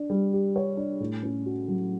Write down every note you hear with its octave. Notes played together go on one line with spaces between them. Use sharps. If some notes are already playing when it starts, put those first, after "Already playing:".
Already playing: D4
G3
G4
C#5
D4
A2
C#4
F#4
F#3